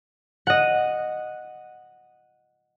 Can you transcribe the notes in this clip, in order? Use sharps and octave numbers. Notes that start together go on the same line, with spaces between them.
D#5 F#5